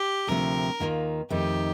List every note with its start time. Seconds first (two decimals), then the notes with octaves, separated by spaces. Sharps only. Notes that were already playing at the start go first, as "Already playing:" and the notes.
Already playing: G4
0.27 D2 C3 F3 A3 A#4
0.80 D#2 D#3 A#3 F4
1.30 F2 D#3 A3 D#4 G4